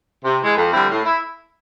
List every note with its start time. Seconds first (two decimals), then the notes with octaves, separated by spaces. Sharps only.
0.25 C3
0.41 E3 G#3
0.57 F2
0.73 D3 G3 C4 E4
0.90 A2
1.06 E4